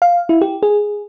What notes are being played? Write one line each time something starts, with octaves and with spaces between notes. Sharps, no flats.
F5
E4
G4
G#4